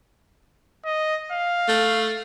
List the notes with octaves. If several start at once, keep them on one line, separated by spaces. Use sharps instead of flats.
D#5
F5
A3